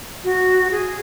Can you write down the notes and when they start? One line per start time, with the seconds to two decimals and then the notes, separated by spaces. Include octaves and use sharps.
0.24 F#4
0.70 G#4